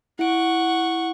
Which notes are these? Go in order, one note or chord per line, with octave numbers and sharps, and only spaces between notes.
E4 F#5 C#6 D7